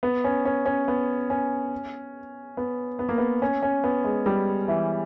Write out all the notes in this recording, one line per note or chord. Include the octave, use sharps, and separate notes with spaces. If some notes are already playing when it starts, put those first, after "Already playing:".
B3
C#4
C#4
C#4
B3
C#4
B3
B3
A#3
B3
C#4
C#4
B3
G#3
G3
E3